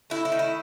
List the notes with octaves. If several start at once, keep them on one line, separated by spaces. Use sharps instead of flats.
A3 E4
E4
D#3
E4